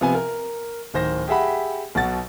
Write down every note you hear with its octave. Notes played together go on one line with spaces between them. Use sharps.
C3 F3 B3 G#5
A#4
D1 D#3 C5 A#6
G4 G#4 E5 F#5 B5
B1 B2 F#5 A6